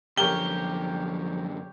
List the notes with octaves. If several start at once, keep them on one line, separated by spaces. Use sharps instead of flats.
F#2 D3 F3 G4 A#4 C#5 G7